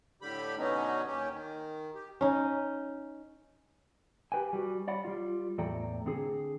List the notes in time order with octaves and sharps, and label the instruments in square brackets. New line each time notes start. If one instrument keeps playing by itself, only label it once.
[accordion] A2 D3 G3 G4 B5
B2 D3 F#3 B3 C#4 D#4
D#2 C#4 G4
D#3
G4
[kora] C#4 D#4
[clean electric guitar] G4 A#4 B4 G5 G#5
G3 F#4
C#5 D5 F#5 B5
G3 F4
E2 A2 A4 D5 G5 A#5
D3 C4 G#4